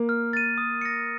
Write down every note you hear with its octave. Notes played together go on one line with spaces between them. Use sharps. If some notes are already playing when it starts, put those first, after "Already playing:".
Already playing: A#3
F6
A6 D#7
D#6
A#6 C#7